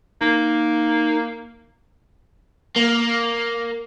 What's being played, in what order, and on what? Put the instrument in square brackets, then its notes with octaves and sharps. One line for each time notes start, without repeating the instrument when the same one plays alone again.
[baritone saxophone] A#3 [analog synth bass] D#4
[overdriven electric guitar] A#3